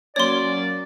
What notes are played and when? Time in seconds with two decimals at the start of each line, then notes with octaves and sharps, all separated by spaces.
0.16 F#3 A#3 C#4 C#5 D5 C6